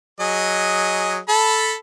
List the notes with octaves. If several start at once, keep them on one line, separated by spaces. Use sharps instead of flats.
F#3 G#4 D#5
A4 A5 B5